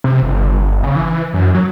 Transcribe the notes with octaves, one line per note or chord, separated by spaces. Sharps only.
C3
G1
C#3
E3
F#2
F#3